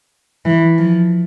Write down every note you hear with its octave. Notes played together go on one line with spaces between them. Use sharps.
E3
F3